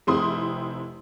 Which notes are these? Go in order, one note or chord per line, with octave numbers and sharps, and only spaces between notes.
F1 C3 C4 E4 C6 D#6